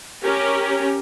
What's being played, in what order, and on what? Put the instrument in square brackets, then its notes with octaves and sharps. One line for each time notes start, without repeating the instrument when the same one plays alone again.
[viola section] C#4 G4 A#4